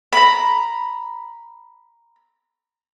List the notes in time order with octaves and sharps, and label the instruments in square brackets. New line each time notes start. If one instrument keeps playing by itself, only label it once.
[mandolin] A#5 B5